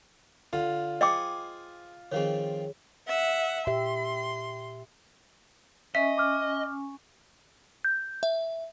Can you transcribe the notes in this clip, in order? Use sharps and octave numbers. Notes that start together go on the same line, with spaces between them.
D3 F4
G#4 C5 D#5 G5 D6
D#3 F3 C4 G#4 C#5
E5 F#5
A#2 G4 E5 C6
C#4 D#5 E5 G#5 C#6
D6 F6
G6
E5